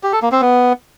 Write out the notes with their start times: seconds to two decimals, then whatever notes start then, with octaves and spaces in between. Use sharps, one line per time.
0.03 G4
0.13 A4
0.22 A#3
0.32 C4
0.41 B3